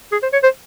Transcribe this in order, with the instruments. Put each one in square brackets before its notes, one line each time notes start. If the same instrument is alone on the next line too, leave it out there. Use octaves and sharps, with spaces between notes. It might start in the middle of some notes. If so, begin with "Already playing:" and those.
[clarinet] G#4
C5
C#5
C5